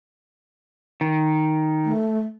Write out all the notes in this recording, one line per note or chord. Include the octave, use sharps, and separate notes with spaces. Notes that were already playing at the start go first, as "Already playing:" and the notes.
D#3
A3